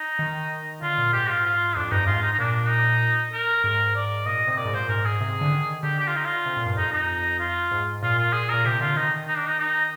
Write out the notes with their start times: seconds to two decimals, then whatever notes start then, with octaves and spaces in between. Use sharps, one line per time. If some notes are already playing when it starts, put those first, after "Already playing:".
Already playing: D#4
0.19 D#3
0.82 D3 F4
0.98 A#2
1.13 G#2 G4
1.29 F4
1.45 F4
1.76 F2 D4
1.92 G2 D#4
2.07 G#2 F4
2.23 D#4
2.33 D#4
2.38 A#2 D4
2.69 D#4
3.33 A#4
3.64 G#2 A#4
3.96 D5
4.26 A#2 D#5
4.47 C3 D#5
4.57 A#2 D5
4.65 G#2
4.73 A#2 C5
4.89 G#2 A#4
5.05 G#2 G#4
5.21 C3
5.41 D3
5.52 D#3
5.83 D3 G4
5.99 G4
6.08 F4
6.16 D#4
6.25 F4
6.46 C3
6.57 A#2
6.66 G2
6.77 F2 D#4
6.93 D#4
7.39 F4
7.71 G#2
8.03 A#2 F4
8.18 F4
8.33 G#4
8.49 A#2 A#4
8.65 C3 G4
8.80 D3 F4
8.96 D#3 D#4
9.28 D#4
9.37 D4
9.48 D#4
9.59 D#4